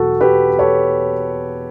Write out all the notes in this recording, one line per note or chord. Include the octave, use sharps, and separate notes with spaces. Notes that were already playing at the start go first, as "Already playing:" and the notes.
Already playing: E2 B2 F#3 F#4 A4
G4 B4
A4 C#5